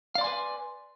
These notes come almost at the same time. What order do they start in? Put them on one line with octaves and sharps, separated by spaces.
F5 D5 C6 G#5 B4